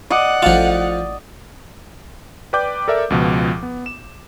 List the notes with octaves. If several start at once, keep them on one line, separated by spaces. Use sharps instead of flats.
D5 D#5 F#5 D6
A1 F3 F4 A4
B4 D5 G5 D6 G6
A4 A#4 D5 E5
C#2 B2 F3
B3
E7